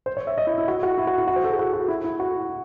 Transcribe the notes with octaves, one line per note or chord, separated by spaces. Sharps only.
C5
C#5
E5
D#5
E4
E4
F#4
F#4
E4
F#4
E4
F#4
C5
A4
G#4
F#4
F#4
E4
E4
F#4